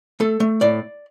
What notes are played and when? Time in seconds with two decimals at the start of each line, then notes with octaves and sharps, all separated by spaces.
0.20 A3 A4
0.40 A3
0.61 A2 D5